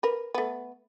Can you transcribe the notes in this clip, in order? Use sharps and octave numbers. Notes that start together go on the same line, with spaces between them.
A#4 B4
A3 B3